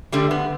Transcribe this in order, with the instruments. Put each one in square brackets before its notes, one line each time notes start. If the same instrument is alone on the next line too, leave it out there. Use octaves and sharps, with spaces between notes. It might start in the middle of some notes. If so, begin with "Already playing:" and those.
[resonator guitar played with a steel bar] D3 G3 A3
B3